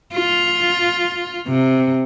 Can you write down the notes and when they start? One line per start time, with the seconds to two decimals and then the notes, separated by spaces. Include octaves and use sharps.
0.14 F4
1.48 C3